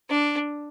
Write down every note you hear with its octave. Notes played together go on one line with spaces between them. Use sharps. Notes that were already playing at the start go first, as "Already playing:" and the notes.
D4